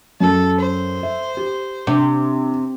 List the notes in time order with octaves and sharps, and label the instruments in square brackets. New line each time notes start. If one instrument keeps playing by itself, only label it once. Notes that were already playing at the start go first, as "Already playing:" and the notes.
[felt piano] F#2 [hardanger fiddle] A4
[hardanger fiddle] C5
[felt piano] E5
G4
[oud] C3 [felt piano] D4